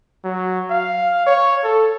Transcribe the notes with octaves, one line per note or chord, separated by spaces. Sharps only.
F#3
F5
C#5
A4